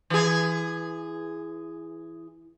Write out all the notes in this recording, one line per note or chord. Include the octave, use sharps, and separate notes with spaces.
E3 G#4